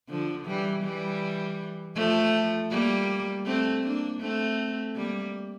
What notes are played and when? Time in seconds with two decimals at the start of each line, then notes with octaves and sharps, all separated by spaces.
0.08 D3 F3
0.46 E3 G3
0.83 E3 G3
1.95 F3 A3
2.71 G3 A#3
3.46 A3 C4
3.83 A#3 D4
4.21 A3 C4
4.96 G3 A#3